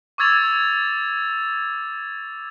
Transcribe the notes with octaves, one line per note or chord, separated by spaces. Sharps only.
C#6 D6 E6 G#6 A6 F7